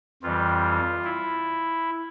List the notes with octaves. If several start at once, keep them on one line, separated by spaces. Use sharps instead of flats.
F2 E3 G3 F4
E4